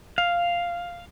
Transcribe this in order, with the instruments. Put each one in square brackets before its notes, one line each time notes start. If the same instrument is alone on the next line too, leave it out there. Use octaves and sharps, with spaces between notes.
[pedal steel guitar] F5